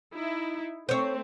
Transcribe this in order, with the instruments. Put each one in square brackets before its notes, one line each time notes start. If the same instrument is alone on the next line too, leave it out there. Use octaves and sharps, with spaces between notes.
[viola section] D#4 E4
[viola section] A3 C4 [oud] C5 C#5